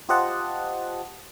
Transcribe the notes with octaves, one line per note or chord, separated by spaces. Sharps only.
F4 G4 C5 D#5 F#5 A5